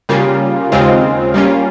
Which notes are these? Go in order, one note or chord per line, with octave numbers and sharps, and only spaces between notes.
C#3 G3 A#3 F4
D#2 C#3 G#3 C4 F4
G3 A#3 C#4 F4